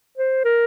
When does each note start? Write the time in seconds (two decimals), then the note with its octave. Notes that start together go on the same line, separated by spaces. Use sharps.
0.18 C5
0.45 A#4